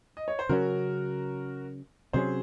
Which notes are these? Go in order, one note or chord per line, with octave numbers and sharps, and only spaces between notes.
D#5
C#5
C5
C#3 F#3 C#4 F#4 A#4
C3 F#3 C#4 G#4 C5